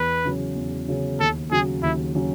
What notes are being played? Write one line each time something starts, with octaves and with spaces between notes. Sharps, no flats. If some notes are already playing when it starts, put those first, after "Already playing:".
Already playing: E2 B4
C#3 F#3 C#4
E2
C#3 F#3 C#4
D#2 A4
C#3 F#3 C#4 F#4 G#4
D#2 E4
C#3 F#3 C#4 F#4